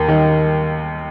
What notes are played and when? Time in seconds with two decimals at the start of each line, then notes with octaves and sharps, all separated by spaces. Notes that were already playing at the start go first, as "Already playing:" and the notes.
Already playing: D#2 A#4
0.08 D#3